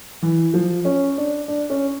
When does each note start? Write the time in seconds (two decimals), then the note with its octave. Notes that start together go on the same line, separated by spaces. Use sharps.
0.22 E3
0.54 F3
0.85 C#4
1.18 D4
1.48 D4
1.70 C#4